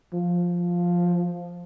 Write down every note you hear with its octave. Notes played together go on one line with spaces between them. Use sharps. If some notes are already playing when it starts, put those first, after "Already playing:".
F3